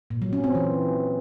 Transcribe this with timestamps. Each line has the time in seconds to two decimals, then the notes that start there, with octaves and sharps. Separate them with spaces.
0.11 A#2
0.22 F#3
0.33 C#4
0.44 C4
0.55 E3